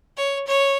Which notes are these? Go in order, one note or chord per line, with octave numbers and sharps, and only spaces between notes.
C#5
C#5